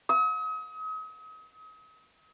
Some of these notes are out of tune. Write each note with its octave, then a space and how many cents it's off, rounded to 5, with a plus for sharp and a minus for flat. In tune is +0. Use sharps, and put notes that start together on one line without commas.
D#6 +40